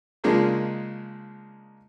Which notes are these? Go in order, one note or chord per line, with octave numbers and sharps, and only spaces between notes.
C#3 F3 G#3 A#3 D4 D#4